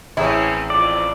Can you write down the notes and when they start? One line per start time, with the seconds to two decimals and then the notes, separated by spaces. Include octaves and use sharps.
0.17 A1 E3 C4 C#4 E4 G#4 C#5
0.70 F2 D5